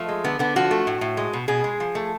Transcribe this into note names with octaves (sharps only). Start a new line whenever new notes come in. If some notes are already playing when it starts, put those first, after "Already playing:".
Already playing: F3 A3
G#3
D3 B3
D3 B3
F3 F#4
A3
A2
A2
G#3
B2
B2 G#4
G#3
F3
A3